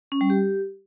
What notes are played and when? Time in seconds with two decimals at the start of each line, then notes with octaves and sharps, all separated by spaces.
0.12 C#4
0.21 G3
0.30 G4